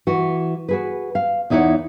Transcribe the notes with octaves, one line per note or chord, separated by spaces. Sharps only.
E3 F#4
F#4 G#4 B4
F5
E2 D#4 E4 C#5 F#5